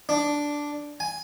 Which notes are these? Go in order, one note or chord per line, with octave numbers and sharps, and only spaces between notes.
D4
G#5